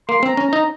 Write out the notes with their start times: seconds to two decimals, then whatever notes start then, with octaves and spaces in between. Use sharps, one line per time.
0.09 A#3 C6
0.23 C4 A#5
0.37 C#4
0.48 A#5
0.53 D#4